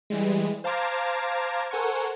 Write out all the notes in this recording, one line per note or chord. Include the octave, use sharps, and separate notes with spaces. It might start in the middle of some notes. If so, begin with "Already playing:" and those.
E3 G3 G#3
C5 F5 A5 A#5 D6 G#6
A4 A#4 C5 F#5 G#5 C#6